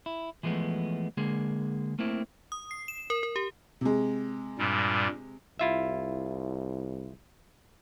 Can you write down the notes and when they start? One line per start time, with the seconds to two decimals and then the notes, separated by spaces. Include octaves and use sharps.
0.06 E4
0.43 E3 F3 G#3 A3 B3
1.17 D3 G#3 A#3 G#4
1.99 A3 A#3 C4 E4
2.52 D#6
2.71 C7
2.88 E7
3.10 A#4
3.23 A#4
3.36 G4
3.81 C3 G#3
4.58 G2 A#2 G3
5.59 C2 E4 F4 E5